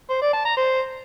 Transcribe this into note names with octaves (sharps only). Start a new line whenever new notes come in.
C5
D5
A5
A#5
C5